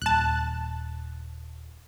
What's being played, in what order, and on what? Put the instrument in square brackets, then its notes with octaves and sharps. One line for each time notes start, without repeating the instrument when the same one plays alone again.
[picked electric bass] D#1 [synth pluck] A5 F#6